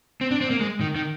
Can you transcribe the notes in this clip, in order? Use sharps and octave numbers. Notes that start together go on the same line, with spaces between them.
C4
D4
C4
A#3
G#3
D#3
D#3